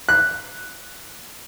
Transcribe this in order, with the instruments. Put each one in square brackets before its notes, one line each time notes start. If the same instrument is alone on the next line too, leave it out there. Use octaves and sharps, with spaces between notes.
[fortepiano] F#6